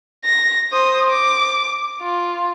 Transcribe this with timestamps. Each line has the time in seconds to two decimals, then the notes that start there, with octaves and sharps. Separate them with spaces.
0.25 A#6
0.72 C5 D#6
1.10 D6
2.02 F4